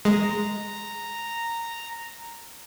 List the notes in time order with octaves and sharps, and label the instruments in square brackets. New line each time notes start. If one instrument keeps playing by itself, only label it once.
[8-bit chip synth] G#3 [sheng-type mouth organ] A#5